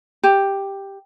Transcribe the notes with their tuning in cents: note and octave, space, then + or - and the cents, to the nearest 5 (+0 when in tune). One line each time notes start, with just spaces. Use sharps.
G4 +5